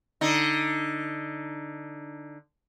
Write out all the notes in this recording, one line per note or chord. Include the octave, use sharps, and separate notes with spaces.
D3 D#4